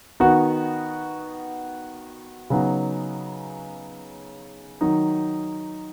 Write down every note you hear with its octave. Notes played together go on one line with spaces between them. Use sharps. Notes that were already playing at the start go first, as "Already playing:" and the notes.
D#3 B3 D#4 F#4
C#3 F#3 B3 D#4
D#3 F#3 D#4